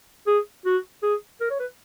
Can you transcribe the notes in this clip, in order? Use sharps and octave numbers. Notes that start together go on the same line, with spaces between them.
G#4
F#4
G#4
A#4
C#5
B4